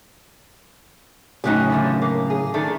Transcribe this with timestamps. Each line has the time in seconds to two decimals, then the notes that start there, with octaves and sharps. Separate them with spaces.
1.44 F#2 A2 C#3 D#4 F#4 G4
1.70 D3 E3 F3
2.02 A#3
2.30 G#4
2.54 D#3 A3 D4